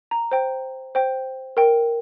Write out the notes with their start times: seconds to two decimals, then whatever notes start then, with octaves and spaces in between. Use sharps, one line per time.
0.11 A#5
0.32 C5 G5
0.95 C5 G5
1.57 A#4 G5